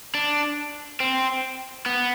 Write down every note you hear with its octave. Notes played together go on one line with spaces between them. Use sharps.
D4
C4
B3